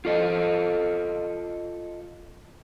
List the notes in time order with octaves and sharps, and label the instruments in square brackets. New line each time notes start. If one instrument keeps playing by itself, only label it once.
[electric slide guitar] F4 A4 D#5